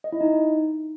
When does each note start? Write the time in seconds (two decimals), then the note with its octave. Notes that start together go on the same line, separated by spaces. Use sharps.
0.04 D#5
0.12 E4
0.21 D#4